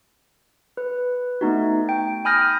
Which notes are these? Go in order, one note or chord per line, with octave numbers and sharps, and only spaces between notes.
B4
A3 B3 D#4 F#4
G5
G#5 B5 D#6 F6 G6 A#6